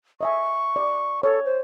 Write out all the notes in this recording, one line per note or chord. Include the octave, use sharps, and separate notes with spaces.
D#5 E5 G#5 C#6
D5
A4 C#5
C5